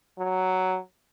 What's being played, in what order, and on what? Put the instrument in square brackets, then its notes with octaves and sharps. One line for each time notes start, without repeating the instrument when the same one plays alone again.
[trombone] F#3